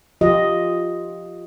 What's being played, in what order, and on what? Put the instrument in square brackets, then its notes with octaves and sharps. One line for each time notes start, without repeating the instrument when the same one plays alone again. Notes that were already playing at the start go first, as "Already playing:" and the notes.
[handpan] F3 F4 G4 D#5